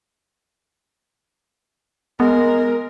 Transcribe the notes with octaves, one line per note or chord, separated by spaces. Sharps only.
G#3 B3 A#4